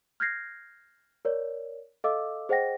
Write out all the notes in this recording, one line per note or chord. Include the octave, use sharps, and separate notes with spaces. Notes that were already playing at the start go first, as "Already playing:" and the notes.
F6 G6 G#6 A#6 C7
A#4 C#5 D5
A4 D#5 F5 D6 E6
G#4 C5 D#5 F#5 G5 A#6